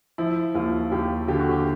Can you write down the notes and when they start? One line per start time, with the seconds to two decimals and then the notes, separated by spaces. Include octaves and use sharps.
0.18 F3 E4
0.55 D#2 F4
0.92 D#2 G4
1.28 D3 G4
1.40 F#4
1.51 G4